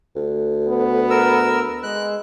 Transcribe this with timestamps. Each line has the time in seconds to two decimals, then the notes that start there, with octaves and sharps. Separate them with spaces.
0.15 D2
0.69 B3
1.10 A#4 E6
1.83 G#3 F#6